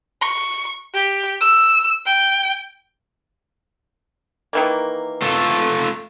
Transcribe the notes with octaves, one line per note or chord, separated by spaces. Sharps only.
C#6
G4
E6
G5
D#3 E3 A#3
A3 F4 A4